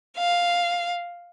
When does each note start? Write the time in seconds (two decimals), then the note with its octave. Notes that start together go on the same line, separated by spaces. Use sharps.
0.17 F5